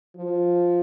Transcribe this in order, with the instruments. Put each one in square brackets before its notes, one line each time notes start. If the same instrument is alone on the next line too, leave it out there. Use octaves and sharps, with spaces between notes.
[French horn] F3